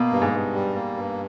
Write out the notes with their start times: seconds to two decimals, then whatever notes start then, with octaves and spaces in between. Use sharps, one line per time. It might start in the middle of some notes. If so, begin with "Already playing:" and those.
Already playing: B2 A#3
0.11 G2
0.22 G#2
0.33 G2
0.54 G3
0.76 A#3
0.97 G2